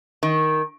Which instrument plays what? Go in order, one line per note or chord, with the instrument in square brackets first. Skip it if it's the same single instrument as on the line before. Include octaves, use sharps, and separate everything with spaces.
[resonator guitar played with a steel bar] D#3